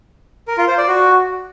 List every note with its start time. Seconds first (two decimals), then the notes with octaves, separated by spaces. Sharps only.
0.48 A#4
0.58 F4
0.68 C5
0.78 D5
0.88 F#4